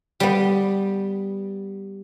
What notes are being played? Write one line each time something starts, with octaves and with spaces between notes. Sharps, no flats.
G3 B3